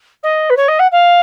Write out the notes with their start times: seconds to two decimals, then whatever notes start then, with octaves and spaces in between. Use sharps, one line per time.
0.23 D#5
0.50 B4
0.56 C#5
0.68 D#5
0.79 F#5
0.91 F5